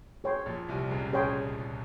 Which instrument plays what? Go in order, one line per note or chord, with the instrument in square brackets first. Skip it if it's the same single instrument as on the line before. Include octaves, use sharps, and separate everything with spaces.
[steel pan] G#4 C#5 G5 C6
[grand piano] A#1 A#2
C2 C3
C#2 C#3
[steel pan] G#4 C#5 G5 C6